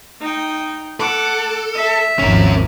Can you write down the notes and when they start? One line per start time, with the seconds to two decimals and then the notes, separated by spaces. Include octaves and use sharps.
0.20 D#4 G5
1.00 A4 F#5 D6
1.75 E5
2.19 G#1 D#2 F3 C#4 A#4